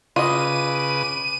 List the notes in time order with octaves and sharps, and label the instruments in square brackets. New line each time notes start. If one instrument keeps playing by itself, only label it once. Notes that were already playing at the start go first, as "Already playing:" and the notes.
[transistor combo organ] C#3 B4 D6 [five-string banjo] F4 D#5 [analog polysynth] D#7